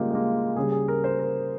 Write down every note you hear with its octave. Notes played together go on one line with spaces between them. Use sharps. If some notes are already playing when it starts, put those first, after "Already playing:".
Already playing: C#3 G3 G#3 A#3 F4 G4
G#3
A#3
C#3 G3 G#4
G#4
A#4
C5
A#4